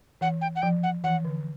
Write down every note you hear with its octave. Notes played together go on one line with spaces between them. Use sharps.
E3 F#5
G5
F#5
F3 G5
F#5
E3 F#5
D3